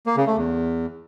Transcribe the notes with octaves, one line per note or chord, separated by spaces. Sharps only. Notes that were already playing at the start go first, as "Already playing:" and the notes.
A#3
C#3
A3
E2